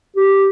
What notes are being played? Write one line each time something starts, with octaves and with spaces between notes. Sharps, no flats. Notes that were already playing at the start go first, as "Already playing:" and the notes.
G4